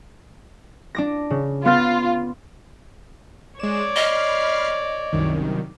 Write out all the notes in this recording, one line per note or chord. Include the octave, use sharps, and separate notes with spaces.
D4 D6 A#6
C#3
B3 F4 F6 A6
G#3 C#5 D5 E7
D#5 B5 F6 C7
C2 F#2 D#3